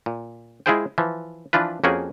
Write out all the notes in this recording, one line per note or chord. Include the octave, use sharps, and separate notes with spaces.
A#2
G#3 E4 F4 G#4 C5 G5
E3 F3
E3 F3 D4 F4 B4
F2 A#3 C#4 F#4 G#4 G5